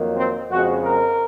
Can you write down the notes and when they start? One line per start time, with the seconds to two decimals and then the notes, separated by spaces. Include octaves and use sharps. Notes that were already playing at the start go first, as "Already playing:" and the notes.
Already playing: F2 D#3 F#3 A#3
0.16 C4
0.50 F2 C#3 G#3 C4 F#4
0.84 A#4